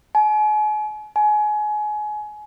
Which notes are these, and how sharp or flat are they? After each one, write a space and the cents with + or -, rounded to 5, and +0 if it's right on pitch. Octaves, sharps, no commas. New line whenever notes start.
G#5 +40
G#5 +25